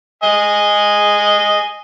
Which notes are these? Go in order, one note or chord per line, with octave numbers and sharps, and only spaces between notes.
D#5 G#5